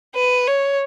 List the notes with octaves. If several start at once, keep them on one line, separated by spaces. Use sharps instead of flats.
B4
C#5